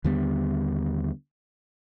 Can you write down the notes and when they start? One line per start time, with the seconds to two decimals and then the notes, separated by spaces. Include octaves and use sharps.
0.04 D#2 D3 G3 B3